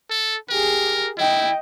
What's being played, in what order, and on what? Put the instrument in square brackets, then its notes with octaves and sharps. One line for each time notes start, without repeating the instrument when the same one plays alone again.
[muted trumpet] A4
[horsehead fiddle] G4 G#4 [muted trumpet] A#4
[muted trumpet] E4 [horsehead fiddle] D#5 G5